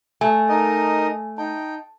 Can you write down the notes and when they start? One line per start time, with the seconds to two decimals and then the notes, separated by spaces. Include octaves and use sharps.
0.21 A3 G#5 A5
0.49 D#4 A#4 D#5
1.38 D#4 G5 A5